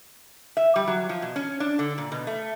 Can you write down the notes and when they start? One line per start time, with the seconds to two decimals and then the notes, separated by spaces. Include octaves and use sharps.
0.57 E5
0.76 G3
0.87 F#3
1.09 F3
1.22 B2
1.36 C#4
1.60 D4
1.79 D3
1.98 A#2
2.12 B2
2.27 A3